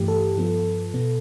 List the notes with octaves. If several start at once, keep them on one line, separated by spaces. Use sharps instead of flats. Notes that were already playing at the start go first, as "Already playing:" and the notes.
Already playing: G2 E3 A3 G4
A4
G2 F3 B3
B2 B3